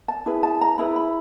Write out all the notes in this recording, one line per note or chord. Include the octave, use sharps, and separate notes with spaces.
A5
E4 G#4 B4
A5
A#5
E4 G#4 B4 B5
B5